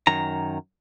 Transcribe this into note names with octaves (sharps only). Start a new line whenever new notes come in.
F#2 D#3 A#5